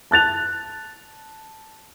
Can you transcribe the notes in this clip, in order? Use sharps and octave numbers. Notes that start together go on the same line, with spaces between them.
A5 F#6 A6 F7